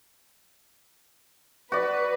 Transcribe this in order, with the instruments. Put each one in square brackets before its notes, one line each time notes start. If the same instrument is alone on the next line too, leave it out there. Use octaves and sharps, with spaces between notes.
[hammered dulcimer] F#4 D5 [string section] B4